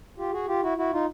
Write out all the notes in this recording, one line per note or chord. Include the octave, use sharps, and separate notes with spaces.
F4 G4
F#4 G#4
F4 G4
E4 F#4
E4 F#4
D#4 F4